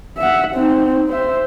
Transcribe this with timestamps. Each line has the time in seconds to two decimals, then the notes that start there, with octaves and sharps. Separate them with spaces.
0.17 E5 F#5
0.55 C4 D#4
1.09 C5 E5